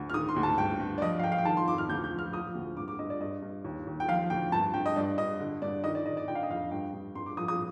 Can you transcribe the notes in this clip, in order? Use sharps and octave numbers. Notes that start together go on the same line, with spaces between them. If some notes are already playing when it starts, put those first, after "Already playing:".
Already playing: D2 D3
F6
D#3 D#6
C6
D2
A5
G2 G5
G2
D5
F3 D#5
F5
F3 G5
F5
G5
D#3 A5
C6
F2 D6
F6
D2 G6
G6
F3
F6
F3 D#6
D2
G2 D6
D6
G2 D#5
D5
G2 D#5
G2
D#2
D#2
G5
F3 F5
D2 G5
G2 A5
G2 G5
D#5
G2 D5
G2 D#5
D3
G2 D5
D#3 D#5
D5
D#3 D#5
D5
D3 G5
F5
D#5
F2 F5
G2 G5
G2
G2 C6
D6
F3 D#6
D#6